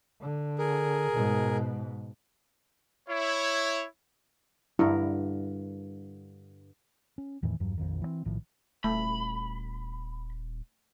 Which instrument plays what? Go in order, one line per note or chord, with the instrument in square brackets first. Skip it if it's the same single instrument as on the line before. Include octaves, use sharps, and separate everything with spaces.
[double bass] D3
[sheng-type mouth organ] G#4 A#4
[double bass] G#2 B2
[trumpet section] E4 C#5
[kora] G2 D3 A#4 [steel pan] E4
[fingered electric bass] C#4
E2 A2 D#3 E3
E2 G2 F#3
A#1 F2 D#3
E3 F3 C4
A#1 A2 D#3 F3
[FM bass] D#1 [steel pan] A3 [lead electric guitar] B5